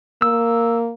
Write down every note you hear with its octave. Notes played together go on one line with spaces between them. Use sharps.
A#3 E6